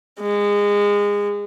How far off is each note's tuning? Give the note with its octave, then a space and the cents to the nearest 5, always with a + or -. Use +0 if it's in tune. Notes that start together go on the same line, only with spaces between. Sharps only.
G#3 -25